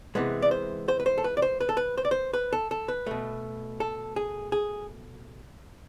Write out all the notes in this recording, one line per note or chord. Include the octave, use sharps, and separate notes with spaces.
C3 E3 G#3 B3
D5
C5
C5
B4
C5
A4
B4
D5
C5
B4
A4
B4
C5
D5
C5
B4
A4
A4
B4
B2 A3
A4
G#4
G#4